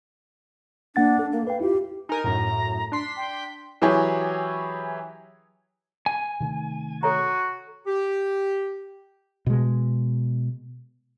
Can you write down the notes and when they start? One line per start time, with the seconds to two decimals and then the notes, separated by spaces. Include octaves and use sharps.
0.96 A#3 D4 F#5 A6
1.19 A4
1.32 A#3
1.47 B4 F5 G5
1.61 E4 F4 G4
2.09 D#4 A#4 G#5
2.24 F#2 A2 A#5
2.92 D4 C6 B6
3.17 G5
3.82 E3 F#3 E4 G4 G#4 C#5
6.06 G#5
6.40 C3 D#3 A3
7.03 F#4 A4 C#5 A#5
7.86 G4
9.46 B2 G#3